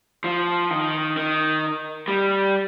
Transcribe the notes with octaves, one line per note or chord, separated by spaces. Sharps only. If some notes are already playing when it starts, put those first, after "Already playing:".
F3
D#3
D#3
G3